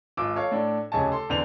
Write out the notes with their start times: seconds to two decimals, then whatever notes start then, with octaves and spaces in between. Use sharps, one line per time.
0.17 G#1 F4 D6 E6
0.36 A4 C#5 F5
0.52 A2 D4 A4
0.92 F1 C#3 C#5 D#5 G#5 A5
1.12 A4 C6
1.30 E2 D3 C4 F7